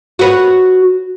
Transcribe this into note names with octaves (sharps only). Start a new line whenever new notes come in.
F#4 B4 C#5